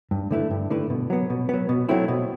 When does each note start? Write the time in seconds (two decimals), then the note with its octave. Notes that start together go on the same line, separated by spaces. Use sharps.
0.11 G2
0.31 D3 A3 E4 B4
0.50 G2
0.70 D3 A3 E4 B4
0.90 B2
1.10 F#3 B3
1.30 B2
1.49 F#3 B3
1.69 B2
1.89 F#3 A3 C4 E4
2.08 B2